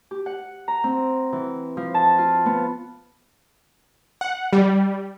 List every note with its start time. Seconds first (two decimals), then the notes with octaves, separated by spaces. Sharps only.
0.11 G4
0.26 F#5
0.68 A#5
0.84 C4
1.33 E3
1.77 F3
1.94 A5
2.18 F4
2.46 B3
4.21 F#5
4.53 G3